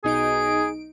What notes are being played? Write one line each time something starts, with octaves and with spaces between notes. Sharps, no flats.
B1 D#4 G#4 D7